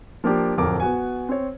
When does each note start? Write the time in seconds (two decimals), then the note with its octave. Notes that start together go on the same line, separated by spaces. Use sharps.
0.24 F3 A#3 D4 G4
0.57 D1 F2 A#4 D6
0.80 B3 F#4 G#5
1.29 C4 C#5